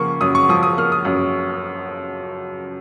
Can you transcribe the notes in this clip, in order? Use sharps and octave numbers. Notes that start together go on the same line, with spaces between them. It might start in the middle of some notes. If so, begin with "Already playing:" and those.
Already playing: C#3 F3 A#3 C#6
F#2 D#6
C#6
F3 D#6
D#6
A#3 F6
D#6
F#2